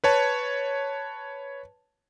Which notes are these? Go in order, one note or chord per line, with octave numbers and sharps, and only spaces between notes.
B4 C#5 A5